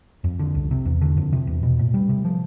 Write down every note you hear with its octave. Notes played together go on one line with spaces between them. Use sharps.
F2
D3
C2
C3
E2
D3
F2
C3
E2
B2
A2
G3
C3
F3